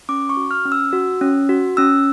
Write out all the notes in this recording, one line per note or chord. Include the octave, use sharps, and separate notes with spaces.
C#4 D6
C#6
F#4
F6
C#4
E6
F#4
C#4
F#4
C#4 E6